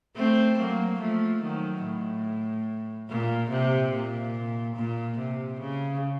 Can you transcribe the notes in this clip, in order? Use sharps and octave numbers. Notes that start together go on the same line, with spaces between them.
A3 C4
F#3 A#3
F3 A3
D#3 F#3
A2
A#2
C3
A#2
A#2
C3
C#3